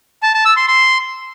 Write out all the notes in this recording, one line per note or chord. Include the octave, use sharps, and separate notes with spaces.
A5
A5
E6
C6
C6